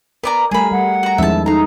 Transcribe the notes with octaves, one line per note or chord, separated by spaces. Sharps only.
B3 A#4 D5 A#5
G3 A3 G#4 A#4 G#5 B5
G3 F#5
F#4 A#5
E2 D#3 F3 G#3 C#4 E4 E5 A5
D#4 A4 F5 A#5